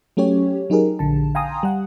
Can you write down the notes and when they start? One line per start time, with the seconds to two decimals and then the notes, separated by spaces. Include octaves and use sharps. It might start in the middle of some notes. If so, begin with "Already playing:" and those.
0.17 F#3 A3 C#4 G4 C#5
0.70 F#3 D#4 G4 G#4 A#4
0.99 A#1 D3 A5
1.35 F5 G5 G#5 A#5 C6 D#6
1.63 G3 F#5